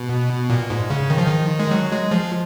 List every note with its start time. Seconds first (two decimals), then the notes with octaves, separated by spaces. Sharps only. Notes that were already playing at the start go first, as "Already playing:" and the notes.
Already playing: B2
0.50 A#2
0.70 G#2
0.90 C#3
1.10 D#3
1.18 F3
1.26 D#3
1.59 G#3
1.71 F#3
1.92 G#3
2.11 F3